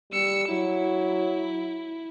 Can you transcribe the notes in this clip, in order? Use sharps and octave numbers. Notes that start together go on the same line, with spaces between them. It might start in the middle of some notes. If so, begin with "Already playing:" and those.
G3 E6 C#7
F#3 E4